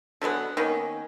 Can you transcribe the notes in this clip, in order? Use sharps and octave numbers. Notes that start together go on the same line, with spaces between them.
D3 F#3 G#3 B3
D#3 A#3 B3 C#4